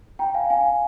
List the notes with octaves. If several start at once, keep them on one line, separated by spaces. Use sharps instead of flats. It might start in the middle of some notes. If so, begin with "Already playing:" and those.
G5 A#5
F5 G#5
F5 G#5